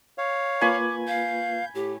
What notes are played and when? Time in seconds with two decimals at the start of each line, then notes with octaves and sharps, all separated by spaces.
0.18 C#5 F5
0.61 A#3 F4 B4 G#5 B5 C#6 D6
1.07 F5 G6
1.75 A2 G4